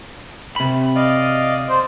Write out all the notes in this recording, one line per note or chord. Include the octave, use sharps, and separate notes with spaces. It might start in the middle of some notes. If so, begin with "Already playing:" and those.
C3 B5
D5 D#5 F5
C5